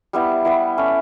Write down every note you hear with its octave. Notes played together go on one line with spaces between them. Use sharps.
G3 B3 E4
G3 B3 E4
C#4 E4 A4